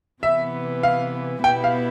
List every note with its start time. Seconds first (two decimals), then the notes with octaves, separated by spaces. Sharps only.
0.23 C3 E3 B3 E5
0.83 F5
1.43 B2 B3 E4 G4 G5
1.64 F5